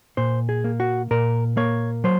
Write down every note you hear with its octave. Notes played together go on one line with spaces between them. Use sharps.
A#2 C5
G#4
A#3
F#4
A#2 A#4
A#3 C#5
F#3 C5